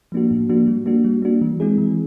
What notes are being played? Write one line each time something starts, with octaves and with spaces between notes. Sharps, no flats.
F3 A#3 D4 F#4
A2
F3 A#3 D4 F#4
G3
A#3 D4 F#4
G3
A#3 D4 F#4
E3
G#3 C4 E4 G#4
E3